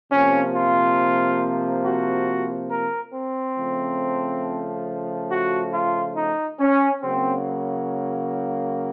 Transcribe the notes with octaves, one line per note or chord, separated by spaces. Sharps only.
C3 F3 A#3 C#4
F4
F#4
A#4
C4
C#3 F3 A3
F#4
F4
D#4
C#4
C#3 F#3 A#3 C4